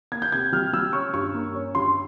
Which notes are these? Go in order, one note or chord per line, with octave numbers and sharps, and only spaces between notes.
A#3 G#6
G6
C3 G#6
G3 F6
G3 E6
C#4 C#6
G2 C#6
A#3
C#4
G2 C6